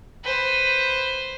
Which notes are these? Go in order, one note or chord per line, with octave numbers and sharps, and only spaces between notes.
B4 C5